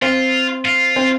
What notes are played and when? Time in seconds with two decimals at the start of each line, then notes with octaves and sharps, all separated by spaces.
0.02 C4 F4
0.65 F4
0.96 C4